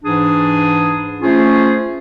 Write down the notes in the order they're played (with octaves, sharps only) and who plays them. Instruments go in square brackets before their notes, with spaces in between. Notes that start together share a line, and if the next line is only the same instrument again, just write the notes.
[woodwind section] G#2 E3 D4 G#4 D#6
A3 C#4 F4 G#4 C5